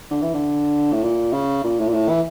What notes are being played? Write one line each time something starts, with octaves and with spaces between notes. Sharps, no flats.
D3
E3
D3
A2
A#2
C#3
A#2
A2
A#2
A2
E3